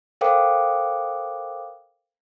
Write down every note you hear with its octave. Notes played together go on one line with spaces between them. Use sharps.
A4 A#4 C5 F5 G5 D6